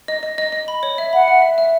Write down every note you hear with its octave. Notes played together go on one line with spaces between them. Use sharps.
D#5
D#5
D#5
D#5
B5
C#5
E5
F#5 B5
E5
E5
E5